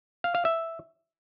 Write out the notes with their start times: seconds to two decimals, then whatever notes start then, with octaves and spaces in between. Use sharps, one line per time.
0.24 F5
0.35 F5
0.45 E5